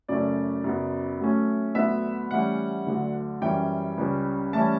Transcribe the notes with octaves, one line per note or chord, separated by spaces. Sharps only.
F#2 C#3 F#3 A3 C#4 D5
F#2 C#3 F#3 B3
A2 F#3 A3 C#4
D2 D3 F#3 B3 E5
A2 E3 G3 C#4 F#5
D2 D3 F#3
F#2 E3 G3 C#4 G5
C#2 C#3 G3 C#4
A2 E3 G3 C#4 A5